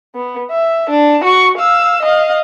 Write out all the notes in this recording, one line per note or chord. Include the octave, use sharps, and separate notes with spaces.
B3
E5
D4
F#4 C#6
F5 E6
D#5 F5